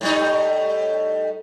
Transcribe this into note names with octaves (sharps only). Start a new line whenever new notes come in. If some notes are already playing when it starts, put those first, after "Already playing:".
A2 G3 D#4